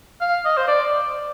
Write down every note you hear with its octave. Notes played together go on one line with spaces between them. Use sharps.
F5
D#5
C5
D5